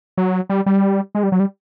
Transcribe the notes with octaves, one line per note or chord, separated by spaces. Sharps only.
F#3
G3
G3
G#3
G3
F#3
G3